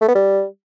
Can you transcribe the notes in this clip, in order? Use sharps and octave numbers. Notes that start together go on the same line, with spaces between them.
A3
B3
G3